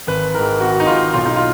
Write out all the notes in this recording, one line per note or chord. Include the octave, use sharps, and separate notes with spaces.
G#1 B4
G#2 D#3 A#4
G#1 F#4
D#4
G#2 D#3 F4
B1 F4
D#4
F4